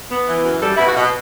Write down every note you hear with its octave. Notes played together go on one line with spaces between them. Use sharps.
B3
E3
F#2
G3 A4
B2 E4
F#4
B2